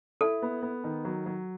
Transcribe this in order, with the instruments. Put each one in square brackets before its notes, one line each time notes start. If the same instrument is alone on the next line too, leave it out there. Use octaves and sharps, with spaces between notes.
[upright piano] E4 [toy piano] A4
[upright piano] B3
B3
D#3
F#3
F#3